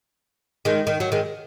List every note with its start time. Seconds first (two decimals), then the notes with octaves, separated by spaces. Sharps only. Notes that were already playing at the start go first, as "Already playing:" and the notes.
0.65 D#3 G#3
0.87 D#3
1.00 F#3
1.12 D#3 G#3